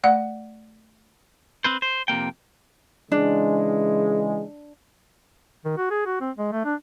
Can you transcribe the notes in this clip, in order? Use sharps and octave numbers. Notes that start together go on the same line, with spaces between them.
A3 D5 F#5
C4 B4 C5
C5
F2 C3 A#3 G5
C#3 E3 G#3 D4
D#3
F#4
G#4
F#4
C4
G#3
A3
D4